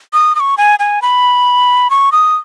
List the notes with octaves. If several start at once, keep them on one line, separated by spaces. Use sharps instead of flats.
D#6
D#6
C#6
G#5
G#5
B5
C#6
D#6